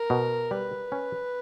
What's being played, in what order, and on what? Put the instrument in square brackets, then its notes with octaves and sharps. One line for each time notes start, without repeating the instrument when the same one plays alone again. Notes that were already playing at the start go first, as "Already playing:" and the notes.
Already playing: [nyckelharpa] A#4
[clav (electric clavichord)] B2
[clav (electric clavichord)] G3 [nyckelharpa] B4
[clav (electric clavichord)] C#4